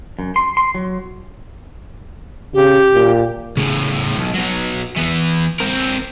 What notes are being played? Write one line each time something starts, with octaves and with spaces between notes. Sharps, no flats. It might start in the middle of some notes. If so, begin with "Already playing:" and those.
F#2
C6
C6
F#3
C#3 G4
A#2
A2 C#3
B1
B2 F#3
E3 B3
C4 A#4